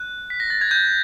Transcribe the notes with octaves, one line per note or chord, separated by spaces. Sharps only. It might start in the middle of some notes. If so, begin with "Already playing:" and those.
Already playing: F#6
B6
A#6
A6
G#6
G6